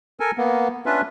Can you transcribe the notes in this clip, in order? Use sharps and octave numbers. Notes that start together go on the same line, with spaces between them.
A4 A#4 G#5
A#3 B3
C#4 D4 F4 B4 E5